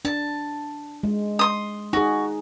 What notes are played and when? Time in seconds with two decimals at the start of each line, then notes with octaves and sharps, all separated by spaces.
0.05 D4 A5
1.03 G#3
1.39 C6 D#6
1.93 D#4 F#4 G#4